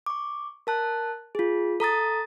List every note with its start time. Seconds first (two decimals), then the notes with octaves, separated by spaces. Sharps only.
0.06 C#6 D6
0.67 A#4 A5 F#6
1.35 F4 G#4
1.80 A4 A#5 D#6 A6